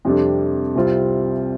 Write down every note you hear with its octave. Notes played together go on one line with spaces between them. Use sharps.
F2 C3 G3 D4 A4
C2 C3 G3 C4 F4